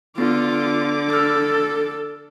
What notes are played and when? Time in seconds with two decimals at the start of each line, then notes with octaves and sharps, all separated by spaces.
0.18 D3 B3 F4 D6
1.10 A4 E6 F6